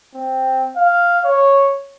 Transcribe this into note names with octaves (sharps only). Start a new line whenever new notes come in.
C4
F5
C#5